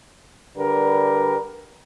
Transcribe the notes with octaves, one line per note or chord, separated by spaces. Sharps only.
D3 G3 A#4 B4